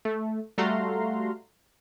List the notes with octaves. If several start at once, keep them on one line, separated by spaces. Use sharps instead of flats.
A3
G3 A3 F#4 F5 A#5 C6